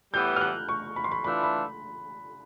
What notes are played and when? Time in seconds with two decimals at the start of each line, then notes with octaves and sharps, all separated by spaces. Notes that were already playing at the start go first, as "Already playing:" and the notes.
0.14 A2 E3 G3 B3 G6
0.36 F6
0.41 F#6
0.69 C#6
0.96 B5
1.04 C6
1.12 B5
1.24 E3 A3 D4 F4 B5
1.43 B5